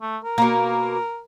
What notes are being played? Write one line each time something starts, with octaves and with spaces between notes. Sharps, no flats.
A3
A#4
B2 A#3